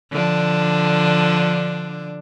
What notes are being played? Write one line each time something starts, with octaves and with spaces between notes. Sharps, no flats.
D3 F3 D4